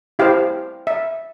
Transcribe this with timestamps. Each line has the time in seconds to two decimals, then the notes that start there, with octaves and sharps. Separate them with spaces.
0.19 E4 G4 C5 F5
0.87 E5